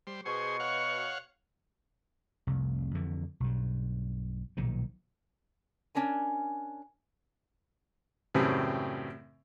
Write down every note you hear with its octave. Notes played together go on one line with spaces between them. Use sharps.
G3 C5
B2 G#4 C5 C#6
C#5 F5 F#5
F1 C2
F2 D3 E3
B1 G2
B1 A#2 D#3 F3
C#4 D4 A#4 G#5
F#2 A2 C#3 E3 G3 C4